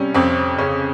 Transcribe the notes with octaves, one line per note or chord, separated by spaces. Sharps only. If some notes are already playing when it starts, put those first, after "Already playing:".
Already playing: C3 G3 C#4
F2 C4
C#3 C#4